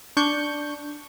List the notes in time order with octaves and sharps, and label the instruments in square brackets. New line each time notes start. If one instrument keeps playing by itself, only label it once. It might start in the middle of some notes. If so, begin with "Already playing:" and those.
[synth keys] D4 C#6 G6